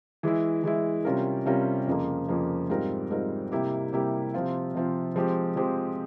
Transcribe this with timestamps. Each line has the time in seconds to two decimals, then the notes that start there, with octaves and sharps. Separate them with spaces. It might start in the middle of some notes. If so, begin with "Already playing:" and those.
0.23 E3 G#3 E4
0.64 E3 G#3 E4
1.05 C3 G3 C#4 F4 A#4
1.46 C3 G3 C#4 F4 A#4
1.87 F2 C#3 F3 A#3
2.29 F2 C#3 F3 A#3
2.70 G#2 G3 C4 F4 A#4
3.10 G#2 G3 C4 F4 A#4
3.52 C3 G3 A#3 E4 G4
3.93 C3 G3 A#3 E4 G4
4.34 C3 F3 C4 F4
4.75 C3 F3 C4 F4
5.16 F3 G#3 C4 G4
5.56 F3 G#3 C4 G4